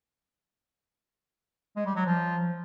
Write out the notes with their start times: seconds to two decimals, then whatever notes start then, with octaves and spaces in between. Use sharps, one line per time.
1.76 G#3
1.86 G3
1.96 F#3
2.06 F3